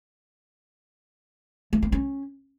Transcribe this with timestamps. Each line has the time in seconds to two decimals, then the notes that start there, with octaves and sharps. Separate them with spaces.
1.73 A3
1.83 C4
1.92 C#4